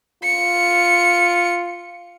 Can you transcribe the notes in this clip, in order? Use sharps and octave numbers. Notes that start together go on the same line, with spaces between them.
F4 C#7